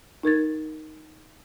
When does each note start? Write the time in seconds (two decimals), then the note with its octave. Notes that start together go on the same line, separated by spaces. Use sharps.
0.23 D#4 A#4 G#6 A6